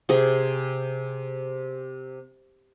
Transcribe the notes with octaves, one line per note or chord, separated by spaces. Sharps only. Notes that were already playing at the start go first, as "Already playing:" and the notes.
C3 G#4